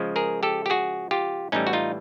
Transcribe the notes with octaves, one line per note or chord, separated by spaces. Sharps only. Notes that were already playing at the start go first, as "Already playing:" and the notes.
Already playing: C#3 F3 G#3
G#4 A#4
G4 A4
G4
F#4 G#4
F4 G4
A2 E3 G3 C#4 D#4
F#4
D#4 F4